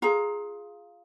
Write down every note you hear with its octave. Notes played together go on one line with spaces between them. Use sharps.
F4 G#4 A#5